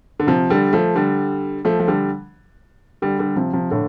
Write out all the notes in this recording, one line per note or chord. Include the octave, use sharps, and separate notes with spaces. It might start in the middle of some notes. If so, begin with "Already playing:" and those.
D3
C3 F3
D3 G3
F3 A3
D3 G3
F3 A3
F3
D3 G3
D3 G3
D3 G3
C3 F3
C3 F3
A2 D3